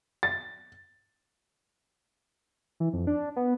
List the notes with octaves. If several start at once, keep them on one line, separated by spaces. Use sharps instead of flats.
A6
E3
F2
D4
B3